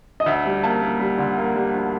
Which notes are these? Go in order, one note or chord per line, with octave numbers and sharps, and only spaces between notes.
D#5
D2 E5
G3
A#3 A5
A#3
G3
D3
A#3
G3
D2